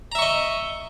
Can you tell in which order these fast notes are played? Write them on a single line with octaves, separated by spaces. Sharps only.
A#5 E5 C#6 D#5